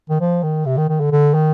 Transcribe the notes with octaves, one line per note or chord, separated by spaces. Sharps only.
D#3
F3
D#3
C3
D#3
D#3
D3
D3
D#3